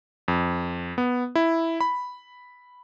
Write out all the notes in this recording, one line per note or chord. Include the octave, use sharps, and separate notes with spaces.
F2
B3
E4
B5